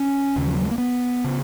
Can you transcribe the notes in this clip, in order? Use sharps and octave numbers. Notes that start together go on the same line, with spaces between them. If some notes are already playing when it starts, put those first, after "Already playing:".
Already playing: C#4
D#2 C#3
F3
F#3
G#3
A#3
B3
C#3